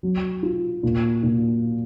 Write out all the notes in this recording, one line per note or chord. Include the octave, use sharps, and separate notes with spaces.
F#3
F4
A#2
A#2